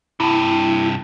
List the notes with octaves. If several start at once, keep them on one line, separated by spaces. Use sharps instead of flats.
G2 C3 E4